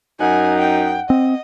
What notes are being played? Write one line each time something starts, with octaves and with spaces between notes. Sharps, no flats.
F#2 D#4 F#5 G#5
G5
C4 D#5